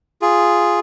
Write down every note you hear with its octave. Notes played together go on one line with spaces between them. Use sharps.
F4 G#4